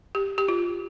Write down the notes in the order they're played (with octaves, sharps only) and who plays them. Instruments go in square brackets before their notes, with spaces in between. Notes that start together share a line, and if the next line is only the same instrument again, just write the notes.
[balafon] G4
G4
F4